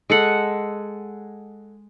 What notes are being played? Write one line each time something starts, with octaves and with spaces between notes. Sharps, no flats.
G#3 A4 F#5